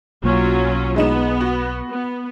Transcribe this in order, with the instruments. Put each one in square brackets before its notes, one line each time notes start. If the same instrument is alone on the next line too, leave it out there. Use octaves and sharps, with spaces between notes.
[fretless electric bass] B1 A#3 [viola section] F#3 C#4 F4
[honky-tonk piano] G#3 D#4 E7 [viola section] B3
[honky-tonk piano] F#4
[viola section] B3